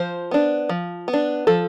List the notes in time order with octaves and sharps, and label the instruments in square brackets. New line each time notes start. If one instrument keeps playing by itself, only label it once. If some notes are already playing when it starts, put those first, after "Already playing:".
Already playing: [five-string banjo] F3 C5
B3 D4
F3
B3
D4
F3 A4